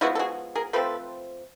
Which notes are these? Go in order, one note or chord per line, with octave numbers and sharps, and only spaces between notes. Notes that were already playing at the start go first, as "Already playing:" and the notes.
F3 G#3 B3 E4 F#4
A4
F#4 G#4
G#4 A#4
F3 A3 C4 A4 B4